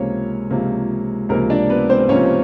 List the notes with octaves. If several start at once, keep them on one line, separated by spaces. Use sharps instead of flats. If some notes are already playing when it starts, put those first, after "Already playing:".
Already playing: C#2 C3 F3 A#3 C#4 C#5
C#2 C3 F3 A#3
C#2 C3 F3 A#3 A#4
D4 D5
B3 B4
C4 C5
C5
C#2 C3 F3 A#3 C#4 C#5